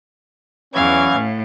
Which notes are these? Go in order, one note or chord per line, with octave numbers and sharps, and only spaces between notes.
E2 E3 F#3 C#4 F5 G#6
A2